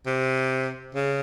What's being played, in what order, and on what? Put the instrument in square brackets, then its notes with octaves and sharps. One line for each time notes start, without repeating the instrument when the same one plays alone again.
[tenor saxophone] C3
C#3